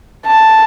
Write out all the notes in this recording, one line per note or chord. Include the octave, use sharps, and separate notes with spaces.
A5